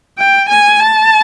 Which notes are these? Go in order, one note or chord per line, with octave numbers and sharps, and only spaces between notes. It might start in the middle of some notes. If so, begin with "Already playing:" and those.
G5
G#5
A5